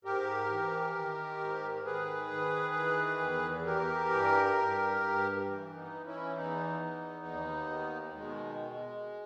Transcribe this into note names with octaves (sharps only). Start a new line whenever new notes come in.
G#2 G4 A#4
E3
D#3
G#2
D#3 G#4 B4
D#3
E3
E2
E3 G4 A#4
G2
G2
G2
E3
B3 D#4
E3
C#4 E4
E2 B3 D#4
E2
D#2
D#3
B2 G#3